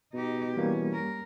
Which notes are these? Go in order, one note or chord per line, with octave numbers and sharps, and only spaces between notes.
B2 D#4 G4
E3 G3 A#3 C#4
A#4